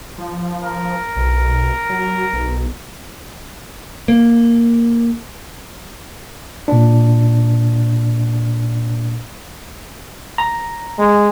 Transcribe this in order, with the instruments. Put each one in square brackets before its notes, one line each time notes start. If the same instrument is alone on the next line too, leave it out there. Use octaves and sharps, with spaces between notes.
[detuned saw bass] F3
[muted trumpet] A#4
[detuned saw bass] B1
F#3
B1
[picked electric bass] A#3
[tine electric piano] A#2 D4
A#5
[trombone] G#3